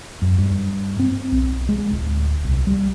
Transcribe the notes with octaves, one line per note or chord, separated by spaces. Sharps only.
F#2
G2
C4
B1
G#3
D1
C2
G3